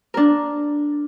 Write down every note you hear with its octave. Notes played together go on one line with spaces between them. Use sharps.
D4 A#4